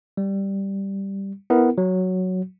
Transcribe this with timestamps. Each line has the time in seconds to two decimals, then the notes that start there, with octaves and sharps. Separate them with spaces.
0.17 G3
1.50 B3 E4 A#4
1.78 F#3